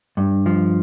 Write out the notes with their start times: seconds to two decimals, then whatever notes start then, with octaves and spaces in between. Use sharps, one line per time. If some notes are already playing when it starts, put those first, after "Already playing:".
0.17 G2
0.46 F3